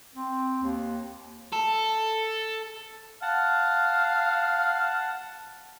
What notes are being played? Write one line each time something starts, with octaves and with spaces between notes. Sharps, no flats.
C4
D#2
A4
F5 F#5 A5